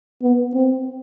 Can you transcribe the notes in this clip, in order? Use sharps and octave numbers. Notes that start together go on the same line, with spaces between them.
B3
C4